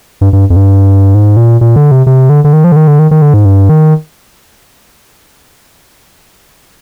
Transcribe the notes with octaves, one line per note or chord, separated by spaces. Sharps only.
G2
G2
F2
G2
G#2
A#2
A#2
D3
C3
C3
D3
D3
D#3
F3
D3
D#3
D3
D#3
D#3
D3
G#2
G2
D#3